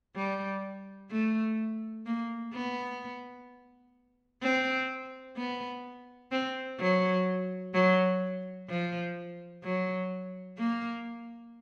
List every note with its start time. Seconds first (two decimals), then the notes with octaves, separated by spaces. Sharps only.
0.16 G3
1.11 A3
2.06 A#3
2.53 B3
4.42 C4
5.37 B3
6.32 C4
6.80 F#3
7.74 F#3
8.69 F3
9.64 F#3
10.58 A#3